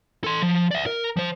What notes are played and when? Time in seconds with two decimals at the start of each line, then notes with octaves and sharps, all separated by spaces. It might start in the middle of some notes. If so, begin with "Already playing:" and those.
0.24 A4 C6
0.42 F3
0.71 D5 E5
0.86 A#4
1.17 F3 C5